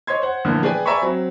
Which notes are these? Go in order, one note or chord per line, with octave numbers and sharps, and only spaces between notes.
C#5 D#5 C6 G#6
C5 F#5
A#2 D3 E3 F3 A3 B3
G#4 B4 D5 G5 G#5
D5 E5 G#5 A#5 B5 C#6
F#3 C4